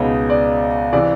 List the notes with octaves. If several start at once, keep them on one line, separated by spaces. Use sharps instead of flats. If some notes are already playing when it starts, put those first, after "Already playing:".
Already playing: C#2 B2 G#3 B3 D#4 C#5
D5
C3 E3 D5